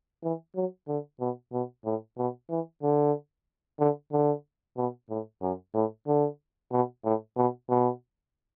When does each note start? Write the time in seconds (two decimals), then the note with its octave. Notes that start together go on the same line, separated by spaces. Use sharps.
0.23 E3
0.55 F#3
0.88 D3
1.20 B2
1.53 B2
1.85 A2
2.17 B2
2.50 E3
2.83 D3
3.79 D3
4.12 D3
4.77 B2
5.09 A2
5.42 F#2
5.74 A2
6.07 D3
6.72 B2
7.04 A2
7.37 B2
7.69 B2